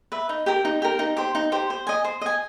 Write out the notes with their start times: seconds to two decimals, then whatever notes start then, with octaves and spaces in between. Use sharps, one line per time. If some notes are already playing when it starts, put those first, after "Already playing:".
0.12 B4 E5
0.29 D#4
0.46 G4 A#4
0.65 D#4
0.82 G4 A#4
0.99 D#4
1.17 G4 C5
1.35 D#4
1.52 G4 C5
1.70 C5
1.87 D#5 G#5
2.04 C5
2.21 D#5 G#5